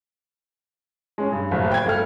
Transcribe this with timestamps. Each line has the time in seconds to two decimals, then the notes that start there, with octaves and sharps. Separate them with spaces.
1.18 G#3 C#4
1.32 G2
1.51 F#1 D#2 A2
1.71 G5 G#6
1.86 G1 A3 F6